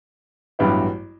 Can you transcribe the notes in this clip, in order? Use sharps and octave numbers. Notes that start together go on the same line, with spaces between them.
A1 G2 F#3 B3 E4